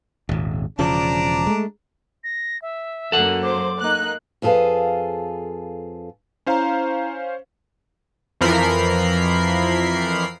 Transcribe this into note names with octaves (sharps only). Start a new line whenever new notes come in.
D#1 G#1
E1 C#3 F3 D4 D5 A#5
G#3 A3
A#6
E5
F#2 F#3 A#3 A4 F#5
C5 D6
A#3 D#4 F#6
F2 F4 G#4 A4 B4 F5
C#4 E4 C5 F5 A#5
F2 E3 F3 A#4 B5 C7